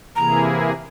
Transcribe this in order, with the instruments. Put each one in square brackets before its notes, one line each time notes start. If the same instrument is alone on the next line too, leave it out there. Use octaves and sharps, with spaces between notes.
[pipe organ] C3 E3 A#3 E4 G#4 [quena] A#5